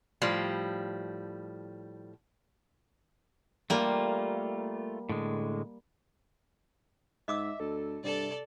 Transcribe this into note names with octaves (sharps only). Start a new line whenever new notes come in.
A2 F3 G3
G3 A3 A#3 F4
A2 D3 G#3
G#2 D#5 E5 D6 E6
D2 A4
G2 C3 A4 D5